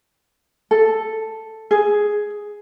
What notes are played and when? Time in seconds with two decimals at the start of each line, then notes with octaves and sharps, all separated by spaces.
0.71 A4
1.71 G#4